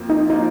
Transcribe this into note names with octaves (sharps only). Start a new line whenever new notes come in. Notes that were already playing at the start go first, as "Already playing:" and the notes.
Already playing: F2 F3 A#3
D#4
F3 A#3 D#4